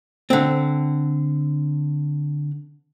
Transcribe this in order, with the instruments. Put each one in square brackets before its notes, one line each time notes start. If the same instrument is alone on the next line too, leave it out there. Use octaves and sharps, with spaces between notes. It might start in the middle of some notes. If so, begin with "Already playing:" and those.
[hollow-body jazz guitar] D3 C4